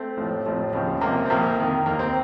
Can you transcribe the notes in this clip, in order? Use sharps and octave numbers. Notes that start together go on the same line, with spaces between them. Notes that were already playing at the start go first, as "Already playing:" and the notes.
Already playing: A3 C4
A1 A2 F3
A1 A2 F3
D#2 C#3 F3
C#2 C3 F3 A#3
C4
C2 A#2 F3 A#3
F2 D#3
D#2 D#3 A#3
C4